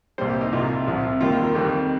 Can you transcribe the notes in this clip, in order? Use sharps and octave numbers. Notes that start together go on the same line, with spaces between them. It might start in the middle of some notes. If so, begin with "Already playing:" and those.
C2 A#2 G3 C5
G4
D#4
C2 C3 G3 F4
C2 C3 F3
D#2 D#3 G3 F4
F4
A#4
F2 D#3 G3 G4